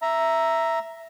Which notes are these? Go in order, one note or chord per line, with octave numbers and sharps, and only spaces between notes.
E5 A#5